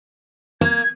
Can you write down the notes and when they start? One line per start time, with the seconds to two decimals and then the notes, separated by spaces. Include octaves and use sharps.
0.61 A#3 G#6